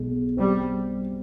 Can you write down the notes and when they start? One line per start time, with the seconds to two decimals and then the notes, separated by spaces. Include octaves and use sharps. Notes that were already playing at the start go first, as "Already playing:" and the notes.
Already playing: B1 G#3
0.11 B2
0.37 G3 C4